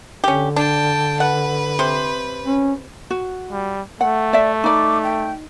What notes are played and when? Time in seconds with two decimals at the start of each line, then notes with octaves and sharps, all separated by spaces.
0.24 D3 C#4 G4
0.56 D4 G5 A5
1.20 B4 F#5
1.79 C3 C5
2.44 C#4
3.11 F#4
3.51 G3
4.01 A3 F#5
4.33 D5 E5
4.64 D#4 D5 D6
5.03 G5